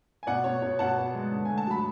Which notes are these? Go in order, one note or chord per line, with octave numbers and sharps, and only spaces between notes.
G#5
B2 D5 F#5
B2 C#5
B2 C#5
B2 F#5 A5
B3
G#3
D3
A3 G#5
A5
F#3 B5